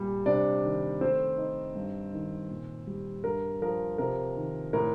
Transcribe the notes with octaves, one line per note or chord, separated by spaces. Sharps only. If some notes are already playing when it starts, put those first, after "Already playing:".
Already playing: A#2 G3
C3 D4 D5
D#3
A3 C4 C5
D#4
G2
D#3
A#2
G3
G2 A#4
F3 A#4
C3 A#4
D#3
A2 A#4